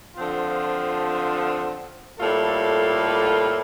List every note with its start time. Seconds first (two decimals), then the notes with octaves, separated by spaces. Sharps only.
0.16 D3 F3 C4 F4
2.19 A2 G3 A#3 F4 A4